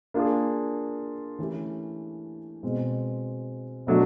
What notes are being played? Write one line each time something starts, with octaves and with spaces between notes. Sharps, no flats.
A#3 D4 F4 G#4
E3 A3 C#4 E4 G4
B2 G#3 C4
B2 F#3 A3 D4 F#4